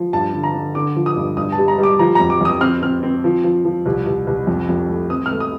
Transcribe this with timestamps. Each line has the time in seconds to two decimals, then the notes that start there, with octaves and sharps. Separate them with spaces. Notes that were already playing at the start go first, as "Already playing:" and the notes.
Already playing: F3
0.13 G2 A5
0.33 D3
0.44 A#5
0.54 D3
0.75 D3 D6
0.96 F3
1.06 D#6
1.16 G2
1.37 G2 D#6
1.52 A5
1.58 G3
1.68 A#5
1.78 G3
1.83 D6
1.99 F3 A#5
2.15 F2 A#5
2.30 D6
2.41 F2 D#6
2.61 C4 F6
2.82 C4 F6
3.03 C4
3.24 F3
3.44 F3
3.65 F3
3.86 C2
4.06 C2
4.27 C2
4.47 F2
4.69 F2
4.88 A3
5.10 C4 D#6
5.26 F6
5.31 A3
5.40 D#6